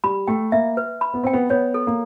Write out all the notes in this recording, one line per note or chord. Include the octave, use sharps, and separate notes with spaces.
G3 B5
A3 G5
A#3 E5
B4
B5
B3
C4 G5
B3
B3 C#5
A4
A#3